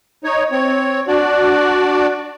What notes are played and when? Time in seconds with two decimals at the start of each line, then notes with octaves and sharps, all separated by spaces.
0.24 D#4 C#5
0.52 C4 C#5
1.08 D4 F#4 D5